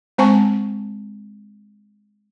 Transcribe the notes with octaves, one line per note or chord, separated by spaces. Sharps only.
G#3 C4 C5 G#5 A5 C#6